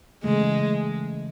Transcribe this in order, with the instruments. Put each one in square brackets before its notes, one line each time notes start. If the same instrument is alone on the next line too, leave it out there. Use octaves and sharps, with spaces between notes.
[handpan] C#3 E3 A3 [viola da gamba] G#3